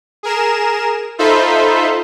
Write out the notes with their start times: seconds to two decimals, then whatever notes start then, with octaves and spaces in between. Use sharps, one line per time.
0.23 G#4 A#4 E7
1.18 D#4 F4 A4 C5 E5 B5